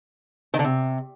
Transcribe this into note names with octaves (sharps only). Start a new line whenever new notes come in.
D#3
D3
C3